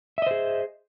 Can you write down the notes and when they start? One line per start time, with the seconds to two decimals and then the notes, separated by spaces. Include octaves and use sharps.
0.18 E5
0.22 D#5
0.27 C5
0.31 G#4